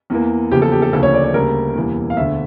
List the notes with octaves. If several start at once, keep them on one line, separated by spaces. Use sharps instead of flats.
E2 E3 A#3
E2 C#3 F3 A#3 G4
A4
G4
A4
D2 C#3 F3 A#3 A4
C#5
D5
C#5
D2 C#3 G3 A#3 A#4
E1 E2 E3 G3 A#3
F5
E1 D2 D3 E5